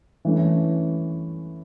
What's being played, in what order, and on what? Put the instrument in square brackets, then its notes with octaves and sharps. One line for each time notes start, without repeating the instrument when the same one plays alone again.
[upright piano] E3 A3 C#4